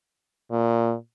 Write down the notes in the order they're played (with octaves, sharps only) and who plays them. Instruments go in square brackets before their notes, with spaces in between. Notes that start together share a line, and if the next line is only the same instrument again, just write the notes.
[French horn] A#2